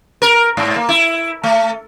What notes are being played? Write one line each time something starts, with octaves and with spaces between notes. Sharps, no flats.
A#4
G#2
A#3
E4
A3